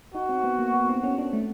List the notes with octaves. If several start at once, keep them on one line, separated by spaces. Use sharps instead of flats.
D#4 F#4
C4
B3
A#3
B3
C4
C#4
D4
A3